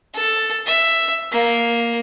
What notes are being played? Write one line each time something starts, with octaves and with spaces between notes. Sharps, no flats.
A4
E5
A#3